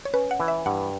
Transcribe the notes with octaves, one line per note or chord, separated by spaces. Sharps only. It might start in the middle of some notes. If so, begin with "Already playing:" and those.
C#5
C#4 B4
F#5
E3
E5
G2 F#5